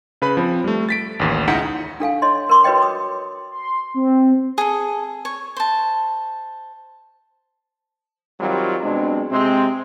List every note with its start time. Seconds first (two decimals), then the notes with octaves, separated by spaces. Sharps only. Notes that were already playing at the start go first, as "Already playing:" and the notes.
0.22 C#3 B4 B5
0.37 F3 C4
0.64 G3 A3
0.89 A6 B6 D7
1.19 A1 D#2
1.48 C#2 D#4 E4 D#5 F#5 B6
2.00 D4 A4 F5 G#5
2.22 C#5 D#5 C6
2.49 A#4 C6 D6
2.64 F#4 B4 C#5 D#5 G5
2.82 D6 D#6
3.52 C6
3.94 C4
4.58 G#4 A4
5.25 C#5
5.57 C5 A5
8.40 D#3 F#3 G3 C4 F4
8.83 B2 G#3 C4 D4
9.31 C3 G#3 C4